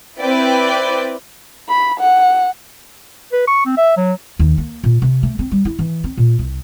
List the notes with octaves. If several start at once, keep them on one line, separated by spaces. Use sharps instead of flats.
C4 E4 B4 D5 G5
B5
F#5
B4
C#6
C4
E5
F#3
D#2
A#3
A#2
C3
A3
C4
G3
E4
E3
C4
A#2
C2